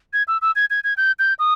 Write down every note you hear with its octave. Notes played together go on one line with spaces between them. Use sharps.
G#6
E6
E6
G#6
G#6
G#6
G6
G6
D#6